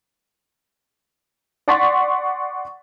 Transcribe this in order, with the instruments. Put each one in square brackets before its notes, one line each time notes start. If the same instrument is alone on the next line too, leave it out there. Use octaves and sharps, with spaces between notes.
[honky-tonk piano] D5 F#5 C6 C#6 A6 B6